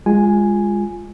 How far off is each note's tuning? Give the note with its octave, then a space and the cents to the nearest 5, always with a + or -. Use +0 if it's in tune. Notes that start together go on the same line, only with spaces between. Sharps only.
G#3 -15 F4 +0 G#5 +0